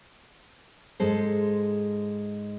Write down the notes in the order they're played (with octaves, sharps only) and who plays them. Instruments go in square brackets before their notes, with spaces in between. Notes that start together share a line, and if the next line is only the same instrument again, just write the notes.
[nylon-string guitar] G#2 G#3 A4 C5